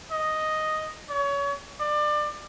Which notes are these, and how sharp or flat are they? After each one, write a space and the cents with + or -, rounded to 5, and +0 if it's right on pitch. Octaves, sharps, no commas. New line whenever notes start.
D#5 +0
C#5 +30
D5 +25